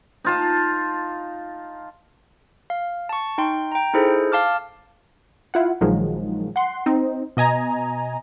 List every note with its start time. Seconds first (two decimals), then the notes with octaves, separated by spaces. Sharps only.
0.24 D#4 F4 A5
2.70 F5
3.09 A5 C#6
3.38 D#4 G5 C6
3.72 G5 A#5
3.94 D#4 E4 G#4 A4 C5
4.32 F5 A5 D6 F6
5.54 E4 F4 F#5
5.81 A#1 D#3 F3 F#3 G#3
6.56 F#5 C6
6.86 C4 D#4
7.37 B2 D#5 G#5 A#5